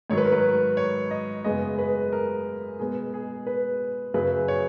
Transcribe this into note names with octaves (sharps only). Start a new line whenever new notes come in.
G#2 D#3 F#3 C#5
B4
A#4
B4
C#5
D#5
F#2 C#3 G#3 B3 D#5
B4
A#4
B2 G#3 B3 G#4
G#4
B4
F#2 C#3 F#3 B4
C#5